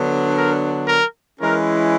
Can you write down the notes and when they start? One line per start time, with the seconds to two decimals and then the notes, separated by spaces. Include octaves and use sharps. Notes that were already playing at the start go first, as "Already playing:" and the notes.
Already playing: D3 F#3 B3 D4
0.36 A#4
0.88 A#4
1.40 E3 G#3 C#4 E4 A#4